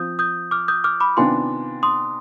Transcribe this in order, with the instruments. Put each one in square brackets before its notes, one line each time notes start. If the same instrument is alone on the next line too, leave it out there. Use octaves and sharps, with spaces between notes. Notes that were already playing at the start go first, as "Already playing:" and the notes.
Already playing: [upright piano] F3 C4 F4 [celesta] D#6 G6
[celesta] D#6 G6
D6 F6
D#6 G6
D6 F6
B5 D6
[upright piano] C3 D#3 B3 D4 F4 [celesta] G#5 C6
[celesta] C6 D#6